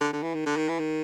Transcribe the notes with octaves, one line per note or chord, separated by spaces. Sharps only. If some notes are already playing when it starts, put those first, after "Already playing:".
D3
D3
E3
D#3
D3
D#3
E3
D#3